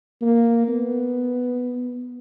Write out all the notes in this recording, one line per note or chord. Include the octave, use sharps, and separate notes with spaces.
A#3
B3